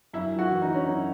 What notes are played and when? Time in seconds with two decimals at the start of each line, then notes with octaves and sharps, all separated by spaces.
0.13 F#2 E4
0.32 F#2
0.39 F#4
0.50 E3
0.62 D#4
0.68 E3
0.74 C#4
0.86 F#2 D#4